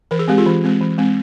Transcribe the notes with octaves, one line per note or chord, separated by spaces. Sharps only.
E3 A#4
G#4
G#3 C4 G4
F4 G#4
E3
G#3 C4
E3
G#3 C4